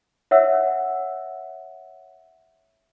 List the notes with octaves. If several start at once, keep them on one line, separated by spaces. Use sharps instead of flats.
C#5 E5 F#5 E6